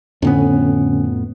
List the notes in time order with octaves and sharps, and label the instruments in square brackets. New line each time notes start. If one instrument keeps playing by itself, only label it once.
[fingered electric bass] F2 A2 B3 [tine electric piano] D3 C#4